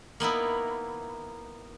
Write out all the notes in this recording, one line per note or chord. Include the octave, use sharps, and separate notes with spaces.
A#3 B3 D#4 E4